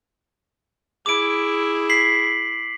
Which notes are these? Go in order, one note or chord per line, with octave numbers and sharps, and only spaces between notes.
E4 G#4 D6 D7
B6 C7 F#7